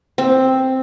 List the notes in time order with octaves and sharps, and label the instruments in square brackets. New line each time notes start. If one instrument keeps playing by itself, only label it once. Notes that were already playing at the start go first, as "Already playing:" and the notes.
[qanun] C4